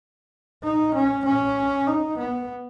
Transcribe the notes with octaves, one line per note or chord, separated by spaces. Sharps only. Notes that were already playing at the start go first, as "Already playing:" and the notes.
D#4
C#4
C#4
D#4
B3